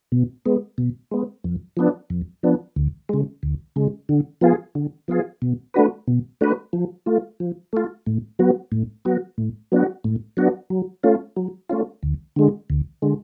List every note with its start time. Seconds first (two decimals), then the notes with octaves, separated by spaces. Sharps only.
0.12 B2
0.46 G#3 B3
0.78 B2
1.11 G#3 B3
1.44 F2
1.77 F3 B3 D4
2.10 F2
2.43 F3 B3 D4
2.76 D2
3.09 C#3 G#3
3.43 D2
3.76 C#3 G#3
4.09 D3
4.41 F3 B3 F4 G#4
4.75 D3
5.08 F3 B3 F4 G#4
5.42 B2
5.74 A3 D4 F#4 B4
6.08 B2
6.41 A3 D4 F#4 B4
6.73 F3
7.06 A3 F4
7.40 F3
7.73 A3 F4
8.06 A2
8.39 F#3 B3 F#4
8.72 A2
9.05 F#3 B3 F#4
9.38 A2
9.72 F#3 B3 D4 F#4
10.04 A2
10.37 F#3 B3 D4 F#4
10.70 F#3
11.03 A3 C#4 F4
11.37 F#3
11.69 A3 C#4 F4
12.03 D2
12.36 D3 G#3
12.70 D2
13.02 D3 G#3